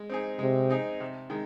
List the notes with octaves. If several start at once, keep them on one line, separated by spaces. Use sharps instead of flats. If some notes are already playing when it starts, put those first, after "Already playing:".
Already playing: G#3
C4 D#4 G#4
C3 G#3
C4 D#4 G#4
C3
D#3 G#3